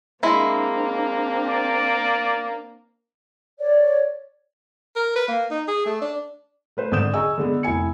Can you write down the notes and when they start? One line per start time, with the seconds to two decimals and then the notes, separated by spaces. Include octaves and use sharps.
0.23 G#3 A#3 C4 D4 E4
1.48 D5
3.59 C#5 D5
4.96 A#4
5.16 B4
5.28 A#3
5.51 D#4
5.68 G#4
5.86 A3
6.01 D4
6.77 A3 B4 C5
6.92 G#1 D3 D#6 G6 E7
7.14 G#4 D#5 G#5 A#5 C#6 E6
7.38 D3 G#3 B3
7.63 F1 E4 G#5 C#7